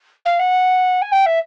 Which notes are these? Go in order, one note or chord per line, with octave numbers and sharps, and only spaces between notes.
F5
F#5
G#5
G5
E5